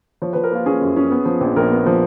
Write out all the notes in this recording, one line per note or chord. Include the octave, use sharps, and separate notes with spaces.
F3 C#5
F3 B4
A#4
A#3 F4
C#4 G#4
F#2
C#4
B3
F3
A#1
A#1 A#4
B3
F3